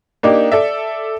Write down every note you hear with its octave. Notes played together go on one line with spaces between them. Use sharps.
A#3 D4 D#4 G4
A4 D5 E5